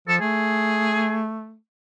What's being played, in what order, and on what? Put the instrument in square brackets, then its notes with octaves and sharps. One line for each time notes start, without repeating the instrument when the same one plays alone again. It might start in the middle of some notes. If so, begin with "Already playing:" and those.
[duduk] F3 [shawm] A4
[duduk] A3 [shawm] G#4